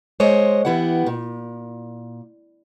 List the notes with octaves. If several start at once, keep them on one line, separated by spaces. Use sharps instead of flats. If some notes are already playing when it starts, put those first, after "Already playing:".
G#3 C5 C#5 D#5
E3 B3 E4 G4 F#5
A#2